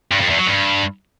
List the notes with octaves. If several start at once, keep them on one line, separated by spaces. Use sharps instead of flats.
G2
F2
E2
F#3
G2